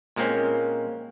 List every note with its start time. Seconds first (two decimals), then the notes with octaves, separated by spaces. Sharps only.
0.16 A#2 G#3 A#3 C4 C#4